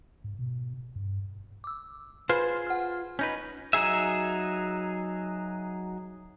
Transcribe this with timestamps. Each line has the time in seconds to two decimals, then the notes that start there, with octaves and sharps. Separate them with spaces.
0.24 G#2
0.39 B2
0.96 G2
1.64 D6 E6
2.29 F4 G#4 B4 C5 B5
2.67 F#5 F6
3.19 C#4 D#4 B4 G6
3.73 F#3 D#4 G#4 E5